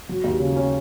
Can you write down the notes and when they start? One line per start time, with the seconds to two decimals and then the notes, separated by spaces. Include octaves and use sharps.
0.09 F#3
0.24 D#2
0.40 C#3
0.56 C#4